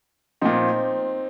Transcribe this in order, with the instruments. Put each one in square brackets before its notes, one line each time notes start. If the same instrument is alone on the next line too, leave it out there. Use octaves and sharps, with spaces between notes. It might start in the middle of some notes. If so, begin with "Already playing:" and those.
[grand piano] A#2 F3 C4 D#4